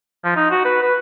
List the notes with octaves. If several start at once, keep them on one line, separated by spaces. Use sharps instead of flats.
F3
D#4
F#4
B4
B4